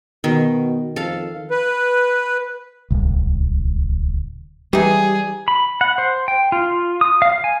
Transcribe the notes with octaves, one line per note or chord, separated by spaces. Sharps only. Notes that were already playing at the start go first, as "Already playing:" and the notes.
B2 D#3
F2 A4 F5
B4
D1 C2
E3 G3 D#4 G4 G#4
B5
F#5
C5
G5
F4
D#6
F5
G#5